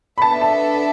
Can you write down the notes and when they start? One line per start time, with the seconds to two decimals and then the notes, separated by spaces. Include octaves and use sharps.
0.18 B5
0.21 B3 D4 A4 E5 A5
0.41 A5